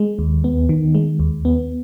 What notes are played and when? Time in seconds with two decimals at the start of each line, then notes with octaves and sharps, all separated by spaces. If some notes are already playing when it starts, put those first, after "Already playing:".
Already playing: G#3
0.19 D#2
0.44 B3
0.69 D#3
0.95 G#3
1.19 D#2
1.45 B3